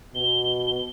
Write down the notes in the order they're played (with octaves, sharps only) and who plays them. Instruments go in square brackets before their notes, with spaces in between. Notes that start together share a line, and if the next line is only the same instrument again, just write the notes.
[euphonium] B2 [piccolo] G7